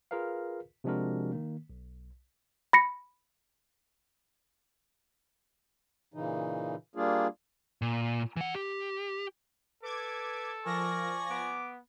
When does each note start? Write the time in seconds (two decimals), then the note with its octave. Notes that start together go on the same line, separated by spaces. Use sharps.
0.11 F4 G#4 A#4 B4 F5
0.84 C3 F3 G#3 D4 F#4 A#4
1.32 D#3 A#3
1.70 B1
2.73 B5 A#6 C#7
6.14 A#2 C#3 E3 D#4
6.96 G3 A#3 D4 F4 G#4
7.82 A#2
8.36 E3 F#5
8.55 G4
9.83 A4 B4 D6 G#6
10.66 F3 A#4 D5 G#5 C#6 A#6
11.30 B3 D6